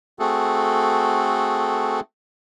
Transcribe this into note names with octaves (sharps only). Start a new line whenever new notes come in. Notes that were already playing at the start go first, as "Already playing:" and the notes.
A3 C4 F#4 G#4 A4